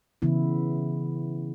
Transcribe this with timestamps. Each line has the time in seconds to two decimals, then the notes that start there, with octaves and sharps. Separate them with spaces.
0.22 C#3 E3 B3 E4